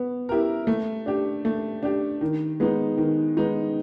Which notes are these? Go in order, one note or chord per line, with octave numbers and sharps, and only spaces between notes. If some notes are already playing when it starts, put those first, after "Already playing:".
Already playing: B3
E4 G4 A#4
A3
D4 G4
A3
D4 G4
D#3
G#3 B3 D#4
D#3
G#3 B3 D#4